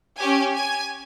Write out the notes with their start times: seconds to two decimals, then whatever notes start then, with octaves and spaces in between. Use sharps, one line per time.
0.18 C#4 G4 G#5
0.55 G#5